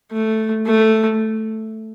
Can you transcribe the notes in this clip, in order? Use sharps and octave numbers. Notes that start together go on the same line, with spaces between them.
A3
A3